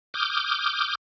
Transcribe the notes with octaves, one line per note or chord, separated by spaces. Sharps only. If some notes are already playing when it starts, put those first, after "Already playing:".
D6 D#6 F6 G6